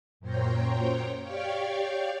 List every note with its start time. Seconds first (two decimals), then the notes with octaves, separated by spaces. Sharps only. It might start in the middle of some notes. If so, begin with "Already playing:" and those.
0.20 F#2 A#2 C5 C#5 G5 A#5
1.21 G4 C#5 D5 F5 G5 C#6